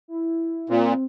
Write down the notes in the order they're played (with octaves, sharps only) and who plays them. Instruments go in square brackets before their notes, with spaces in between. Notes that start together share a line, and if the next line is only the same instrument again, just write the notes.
[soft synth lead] E4
[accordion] A#2 [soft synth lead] C4